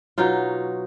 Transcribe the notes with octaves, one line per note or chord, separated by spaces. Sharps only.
B2 F#3 D#4 F4